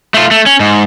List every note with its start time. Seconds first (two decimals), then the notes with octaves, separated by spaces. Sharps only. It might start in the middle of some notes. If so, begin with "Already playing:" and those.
0.14 A3 F4
0.31 A3
0.46 C#4
0.60 G#2